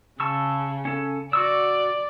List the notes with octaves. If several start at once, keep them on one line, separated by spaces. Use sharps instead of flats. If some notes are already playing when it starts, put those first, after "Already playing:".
C#3 A5 C#6 E6
C#4 A4
F#4 D5 C#6 E6